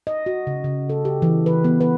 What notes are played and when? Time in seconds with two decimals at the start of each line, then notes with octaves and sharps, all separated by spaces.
0.07 D#5
0.26 F#4
0.47 C#3
0.64 C#3
0.90 A4
1.05 G4
1.22 E3
1.46 B4
1.64 B3
1.81 B4